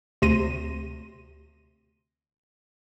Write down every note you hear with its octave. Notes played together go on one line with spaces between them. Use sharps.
D2 C3 C6 A#6 D#7